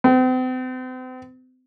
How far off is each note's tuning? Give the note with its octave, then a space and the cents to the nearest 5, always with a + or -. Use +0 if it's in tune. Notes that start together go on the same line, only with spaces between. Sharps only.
C4 -40